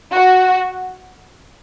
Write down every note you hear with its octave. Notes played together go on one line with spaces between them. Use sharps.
F#4